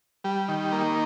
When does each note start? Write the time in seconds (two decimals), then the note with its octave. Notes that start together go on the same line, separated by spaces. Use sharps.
0.24 G3
0.48 D#3
0.72 A#3